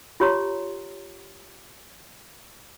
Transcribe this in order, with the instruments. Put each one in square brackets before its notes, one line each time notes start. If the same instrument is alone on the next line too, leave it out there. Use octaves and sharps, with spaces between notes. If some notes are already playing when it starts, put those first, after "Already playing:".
[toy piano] F4 G4 C#5 A#5 C6